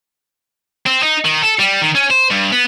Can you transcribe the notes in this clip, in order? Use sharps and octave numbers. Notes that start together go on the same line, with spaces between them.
C4
D#4
D#3
A4
G3
D#3
C#4
C5
G2
B3